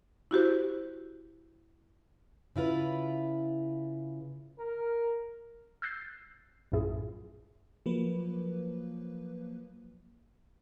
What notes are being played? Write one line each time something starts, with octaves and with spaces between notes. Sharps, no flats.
E4 F#4 G4 C5
C#3 E4 F4 B4
A#4
E6 F#6 G6 A6 C7
A#1 F#2 A2 E4 F4 G#4
F3 F#3 A#3 B4